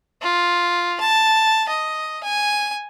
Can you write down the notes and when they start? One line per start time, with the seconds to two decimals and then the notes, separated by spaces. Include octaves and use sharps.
0.22 F4
1.00 A5
1.69 D#5
2.24 G#5